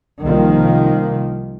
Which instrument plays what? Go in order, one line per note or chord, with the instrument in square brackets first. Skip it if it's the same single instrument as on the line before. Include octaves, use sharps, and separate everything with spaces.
[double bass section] C2 C3 D#3 F3 A#3